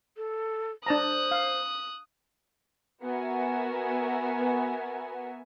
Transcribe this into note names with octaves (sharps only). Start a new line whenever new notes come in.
A4
D4 C5 A5 A#5 D#6 F#6
F5
B3 F#4 A#4 E5 G#5